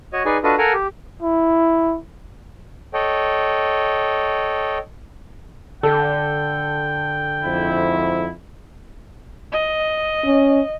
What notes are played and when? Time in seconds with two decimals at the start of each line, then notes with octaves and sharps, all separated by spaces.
0.13 F#4 C#5 D#5
0.25 D#4 G#4 B4 D5 G#5
0.44 D4 F4 F#4 A4 B4 D#5
0.58 A4 A#4 F5 F#5 G#5 A#5
0.73 G4
1.22 E4
2.94 A4 C#5 D#5 G5
5.83 D3 A4 G5
7.45 F2 G#2 E4
9.52 D#5
10.25 C#4